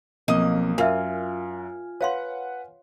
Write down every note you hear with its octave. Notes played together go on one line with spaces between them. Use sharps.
B1 F3 A#3 C4 D#5 D#6
F#2 F4 A#4 E5 G#5 F6
B4 C#5 F5 F#5 C6